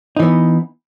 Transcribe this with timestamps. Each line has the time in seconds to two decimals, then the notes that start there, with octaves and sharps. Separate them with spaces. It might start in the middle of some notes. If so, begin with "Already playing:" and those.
0.16 D#4
0.20 E3
0.23 B3